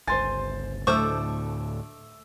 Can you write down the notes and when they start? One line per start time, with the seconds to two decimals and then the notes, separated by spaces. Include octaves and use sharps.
0.08 G1 C#2 C5 G#5 C6 A6
0.87 D2 A2 D3 A3 C5 C#6 D6 E6